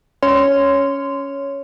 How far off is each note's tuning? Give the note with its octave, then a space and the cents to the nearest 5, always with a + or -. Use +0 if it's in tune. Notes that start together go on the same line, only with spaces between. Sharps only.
C#4 +10 C#5 +0 C6 -15